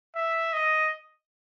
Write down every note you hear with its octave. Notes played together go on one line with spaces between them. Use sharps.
E5
D#5